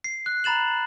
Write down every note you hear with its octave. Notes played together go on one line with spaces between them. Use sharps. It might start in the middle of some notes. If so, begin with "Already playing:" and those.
C7
F#6
A#5 B5 A6 E7 F#7